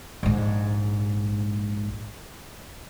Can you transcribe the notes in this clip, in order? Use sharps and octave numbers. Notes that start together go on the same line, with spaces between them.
A#1 G#2